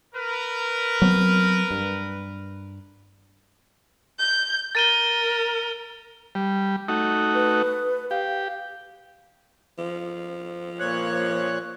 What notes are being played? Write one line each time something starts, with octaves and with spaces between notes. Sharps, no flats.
A#4 B4
F#3 B3 C4
G2
G6
A#4 A6 D#7 G7
G3
A3 D#4 F#4
B4
G4 F5
F3
A#2 C#5 F#6